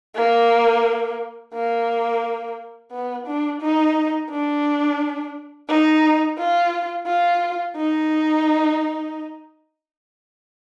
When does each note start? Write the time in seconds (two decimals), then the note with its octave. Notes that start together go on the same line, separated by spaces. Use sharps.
0.16 A#3
1.54 A#3
2.92 B3
3.27 D4
3.62 D#4
4.30 D4
5.69 D#4
6.38 F4
7.06 F4
7.76 D#4